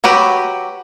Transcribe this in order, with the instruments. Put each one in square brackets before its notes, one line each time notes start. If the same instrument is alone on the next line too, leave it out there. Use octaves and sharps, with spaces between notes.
[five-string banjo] F#3 F#4 G4 B4